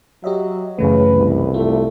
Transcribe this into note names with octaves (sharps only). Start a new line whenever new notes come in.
F#3 G4 D#5 E5
F#2 C#3 E3 A3 B4
C2
A3 F4